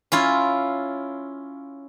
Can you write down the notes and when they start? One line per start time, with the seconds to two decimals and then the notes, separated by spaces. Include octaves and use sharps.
0.12 C#4 E4 F4